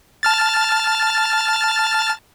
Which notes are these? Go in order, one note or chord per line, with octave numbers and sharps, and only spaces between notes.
A5 F6 A6